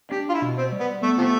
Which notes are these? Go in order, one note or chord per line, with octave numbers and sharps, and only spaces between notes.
D4 G4
F4
E4
B2
C4
G3
B3
A3 B3
C3 F3 A3